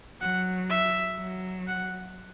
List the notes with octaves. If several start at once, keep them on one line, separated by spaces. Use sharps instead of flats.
F#3 F#5
E5
F#3
F#5